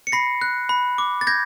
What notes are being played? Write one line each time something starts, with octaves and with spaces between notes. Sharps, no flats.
C#7
B5 A#6 C7
F#6
B5
D6
A6
G6 G#6 A#6